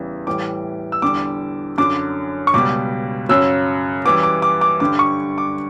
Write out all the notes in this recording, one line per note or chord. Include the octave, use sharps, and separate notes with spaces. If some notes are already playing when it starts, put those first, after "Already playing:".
Already playing: E2 C#3 E3 G3
A2 E3 G3 D6
E6
E2 D3 G3 D6
F#2 D3 F#3 D6
C#6
C#2 B2 G3 D6
F#2 C#3 F#3 E6
F#2 E3 G3 D6
D6
D6
D6
G2 D3 G3 D6
C#6
D6